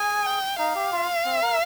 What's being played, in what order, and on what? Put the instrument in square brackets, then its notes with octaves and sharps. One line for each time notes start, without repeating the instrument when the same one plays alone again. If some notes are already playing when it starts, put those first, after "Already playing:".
Already playing: [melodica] G#4 [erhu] G#5
[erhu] G5
[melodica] D#4 [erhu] F5
[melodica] G4
F4
C4
A#4